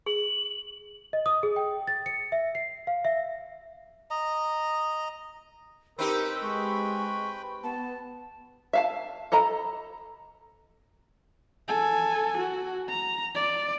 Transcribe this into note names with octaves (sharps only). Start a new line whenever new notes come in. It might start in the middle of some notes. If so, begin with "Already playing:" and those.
G#4 F#7
D#5
D#6
G#4
G5
A6
C#7
E5
C7
F5
E5
D#5 A#5
C4 D#4 G4 A#4 B4 G5 B5 E6
G#3 C#6
B3 A5
E5 F5 A5
A4 D#5 A#5 B5
A4 G#5
F#4
A#5
D5